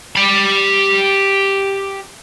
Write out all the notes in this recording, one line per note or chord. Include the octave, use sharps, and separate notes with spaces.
G4 B5